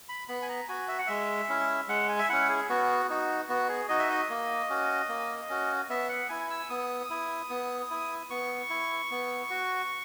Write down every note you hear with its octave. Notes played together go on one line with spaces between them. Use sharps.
B5
B3 B5
G#5
A#5
F#4 G#5
E5
F#5
G#3 E5
C#4 E4
G#3 F#5
G#5
E5
C#4 E4 F#5
G#4
B3 F#4
D#4 F#4
B3 F#4
G#4
D#4 F#4 D#5
E5
D#5
A#3
C#4 F#4
A#3
C#4 F#4
B3 E5
F#5
E4 G#5
E6
B3 D#6
E4
B3
E4
B3 C#6
E4
B3
F#4